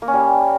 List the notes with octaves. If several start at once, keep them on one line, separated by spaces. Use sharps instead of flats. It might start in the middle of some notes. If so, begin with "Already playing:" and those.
A#3
C#4
G3